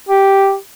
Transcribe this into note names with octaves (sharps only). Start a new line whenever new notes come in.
G4